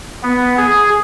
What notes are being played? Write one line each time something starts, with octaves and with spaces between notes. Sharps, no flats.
B3
G#4